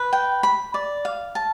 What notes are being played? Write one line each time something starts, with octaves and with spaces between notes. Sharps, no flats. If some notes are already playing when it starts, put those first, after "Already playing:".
Already playing: B4
G5
B5
D5
F5
A5